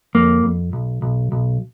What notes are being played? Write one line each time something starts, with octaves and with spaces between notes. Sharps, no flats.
F2 A#3
F2
B1
B1
B1